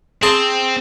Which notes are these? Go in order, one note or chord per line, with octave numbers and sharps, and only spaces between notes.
C4 G#4 A5 C6